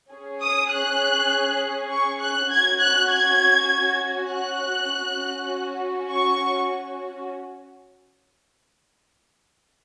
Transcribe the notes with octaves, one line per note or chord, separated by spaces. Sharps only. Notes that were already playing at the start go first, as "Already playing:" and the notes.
C#4 G#4
D#6
F#6
C#6
F#6
C#4 F#4 G#6
F#6
G#6
F#6
C#4 F#4
C#6